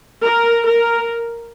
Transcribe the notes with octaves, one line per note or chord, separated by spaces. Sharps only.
A#4
A#4